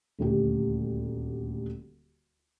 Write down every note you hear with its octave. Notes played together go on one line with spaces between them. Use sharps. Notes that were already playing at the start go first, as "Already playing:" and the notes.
D#1 D2 G4